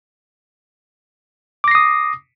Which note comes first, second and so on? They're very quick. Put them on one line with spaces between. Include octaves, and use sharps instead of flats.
D6 A#6 C7 D#6